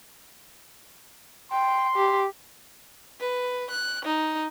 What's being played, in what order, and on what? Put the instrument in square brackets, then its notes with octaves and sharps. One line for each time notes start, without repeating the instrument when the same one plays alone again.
[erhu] G5 [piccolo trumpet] C6
[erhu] G4
[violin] B4
F#6
D#4